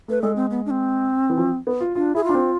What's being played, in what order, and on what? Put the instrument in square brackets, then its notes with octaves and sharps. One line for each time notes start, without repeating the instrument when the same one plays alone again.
[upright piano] A3 [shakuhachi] B4
[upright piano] G#3 [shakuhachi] A4
[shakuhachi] C4
B3
D4
C4
[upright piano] E3
F3
B3
F4
[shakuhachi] D4 [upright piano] F4
[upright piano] E4 [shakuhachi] G#4
[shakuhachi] F4
[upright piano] D4
C4